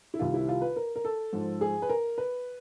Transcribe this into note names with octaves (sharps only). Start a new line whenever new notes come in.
E4
C2 C3 D#3 F4
E4
F4
B4
A#4
A#4
A4
G#2 F3
G#4
B4
A#4
B4